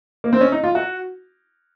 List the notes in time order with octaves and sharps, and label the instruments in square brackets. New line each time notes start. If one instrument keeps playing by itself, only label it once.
[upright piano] A#3
C4
C#4
D#4
F4
F#4